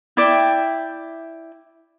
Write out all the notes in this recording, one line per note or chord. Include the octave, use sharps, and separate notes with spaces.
E4 D5 E5 G5